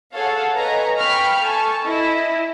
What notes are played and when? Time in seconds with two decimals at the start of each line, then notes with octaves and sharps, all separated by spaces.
0.14 G#4 A4 C#5 F5 F#5
0.56 B4 C#5 D#5 G#5 A#5
0.98 F5 G5 B5 C#6 F6
1.42 A4 G#5 A5 C#6
1.83 E4 D#5